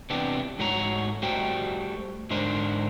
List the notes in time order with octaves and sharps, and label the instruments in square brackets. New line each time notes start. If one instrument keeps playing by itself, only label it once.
[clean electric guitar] C3 E3 B3 D4 G4
G#2 A3 F#4 C#5 A#5
G3 A3 F#4 C5 G5
G#2 D3 D4 A#4 C5